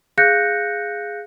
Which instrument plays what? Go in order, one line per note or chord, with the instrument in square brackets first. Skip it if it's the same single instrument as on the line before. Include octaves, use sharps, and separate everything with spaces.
[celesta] G#4 F5 F#6 G6 A#6 C#7